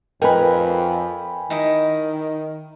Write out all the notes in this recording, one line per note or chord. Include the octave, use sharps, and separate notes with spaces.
F2 D#4 A#4 B4 G5 G#5 B5
D#3 D#4 E4 D#5